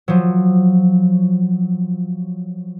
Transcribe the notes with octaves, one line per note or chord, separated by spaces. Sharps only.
F3 F#3